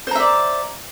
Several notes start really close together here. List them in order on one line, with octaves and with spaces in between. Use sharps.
C5 A#5 E5 D5